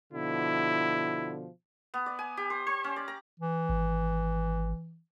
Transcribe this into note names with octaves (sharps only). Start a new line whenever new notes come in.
B2 D3 F3 E4
B3
D5
G#5
G4
C5
C5
C#4
D5
A#5
E3
G#1